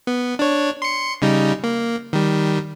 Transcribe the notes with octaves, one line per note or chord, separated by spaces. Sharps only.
B3
D4 C#5
C6 C#7
C#3 G3 D#4
A#3
D#3 G3